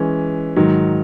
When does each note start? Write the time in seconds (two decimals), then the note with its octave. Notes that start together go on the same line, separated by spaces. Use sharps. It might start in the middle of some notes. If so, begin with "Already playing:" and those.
Already playing: E3 G#3 C#4
0.56 G#2 D#3 F#3